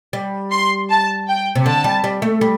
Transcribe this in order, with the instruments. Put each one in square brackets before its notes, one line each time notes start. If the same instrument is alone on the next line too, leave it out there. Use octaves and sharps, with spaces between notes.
[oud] G3
[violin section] C6
A5
G5
[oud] C3
[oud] D3 [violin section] A5
[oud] G3
G3
A3
G3